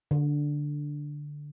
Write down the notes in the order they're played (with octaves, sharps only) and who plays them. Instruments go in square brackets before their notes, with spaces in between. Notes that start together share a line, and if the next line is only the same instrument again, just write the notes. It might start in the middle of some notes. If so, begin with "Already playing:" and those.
[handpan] D3